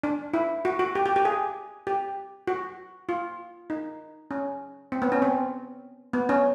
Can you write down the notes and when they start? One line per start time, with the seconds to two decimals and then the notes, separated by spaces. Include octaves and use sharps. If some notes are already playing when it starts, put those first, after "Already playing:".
0.03 D4
0.34 E4
0.65 F#4
0.79 F#4
0.95 G4
1.06 G4
1.16 G4
1.25 G#4
1.87 G4
2.47 F#4
3.09 F4
3.70 D#4
4.31 C#4
4.92 C4
5.02 B3
5.12 C#4
5.22 C4
6.13 B3
6.29 C#4